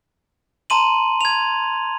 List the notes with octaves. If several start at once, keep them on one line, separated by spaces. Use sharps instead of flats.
A5 A#5 C6 D#7 F#7
G#6 F7